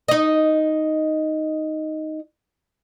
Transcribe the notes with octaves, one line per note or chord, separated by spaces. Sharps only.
D#4 D#5